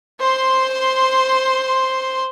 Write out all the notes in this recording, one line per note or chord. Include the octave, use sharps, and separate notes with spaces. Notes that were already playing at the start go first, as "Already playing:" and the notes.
C5 C6